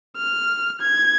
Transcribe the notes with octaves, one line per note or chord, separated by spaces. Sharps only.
F6
G#6